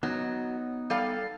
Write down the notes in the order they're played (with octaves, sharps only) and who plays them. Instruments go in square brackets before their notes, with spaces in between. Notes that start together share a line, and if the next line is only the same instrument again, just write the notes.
[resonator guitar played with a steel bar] F#3 [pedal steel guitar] B3 D#4
[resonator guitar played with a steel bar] G3 A4 F5